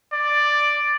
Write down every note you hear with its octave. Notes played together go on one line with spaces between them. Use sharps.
D5